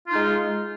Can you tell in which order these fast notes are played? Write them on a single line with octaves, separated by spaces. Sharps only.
F4 D#4 G#3